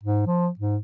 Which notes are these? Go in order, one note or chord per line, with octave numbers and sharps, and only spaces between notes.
G#2
F3
G#2